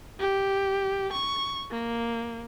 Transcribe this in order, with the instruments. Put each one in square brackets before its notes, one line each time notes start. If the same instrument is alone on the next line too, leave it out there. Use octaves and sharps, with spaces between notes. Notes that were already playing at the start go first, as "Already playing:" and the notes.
[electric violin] G4
C#6
A#3